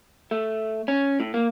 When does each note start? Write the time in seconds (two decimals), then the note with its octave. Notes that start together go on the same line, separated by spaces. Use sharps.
0.31 A3
0.88 C#4
1.20 A2
1.34 A#3